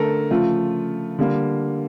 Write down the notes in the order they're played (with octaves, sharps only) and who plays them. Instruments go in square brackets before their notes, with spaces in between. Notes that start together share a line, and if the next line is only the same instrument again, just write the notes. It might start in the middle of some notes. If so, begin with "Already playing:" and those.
Already playing: [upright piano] D3 A3 A4 A#4
C#3 F3 A3 F4
D3 G3 A#3